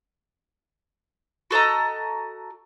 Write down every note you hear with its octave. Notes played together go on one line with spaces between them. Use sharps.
F#4 A4 D#5 A#5